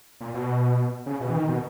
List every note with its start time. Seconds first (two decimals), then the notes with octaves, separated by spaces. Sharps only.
0.21 A#2
0.34 B2
1.06 C#3
1.21 B2
1.30 E3
1.35 D#3
1.49 B2